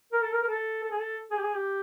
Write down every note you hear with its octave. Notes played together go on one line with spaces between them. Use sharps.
A#4
A4
A#4
A#4
A4
A4
G#4
A4
G#4
G4
G#4
G4